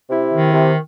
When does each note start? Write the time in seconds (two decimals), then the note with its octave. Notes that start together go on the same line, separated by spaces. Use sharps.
0.10 C3 E4
0.33 D#3
0.53 C3